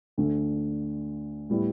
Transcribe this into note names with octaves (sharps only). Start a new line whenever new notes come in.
D2 D3 A3
A2 G3 B3 E4